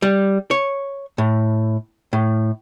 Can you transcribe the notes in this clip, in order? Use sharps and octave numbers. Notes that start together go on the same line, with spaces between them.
G3
C#5
A2
A2